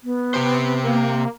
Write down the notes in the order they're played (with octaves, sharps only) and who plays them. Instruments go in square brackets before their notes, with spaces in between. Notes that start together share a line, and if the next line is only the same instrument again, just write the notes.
[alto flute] B3
[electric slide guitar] C3 G4 C5
[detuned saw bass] A#3